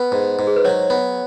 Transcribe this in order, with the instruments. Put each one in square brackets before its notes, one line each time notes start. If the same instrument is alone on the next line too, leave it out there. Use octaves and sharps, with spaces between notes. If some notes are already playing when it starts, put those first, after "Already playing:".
Already playing: [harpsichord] B3 [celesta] B4
[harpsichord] G#2
G#2
[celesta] G#4
B4
[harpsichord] F#3 [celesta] C#5
[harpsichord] B3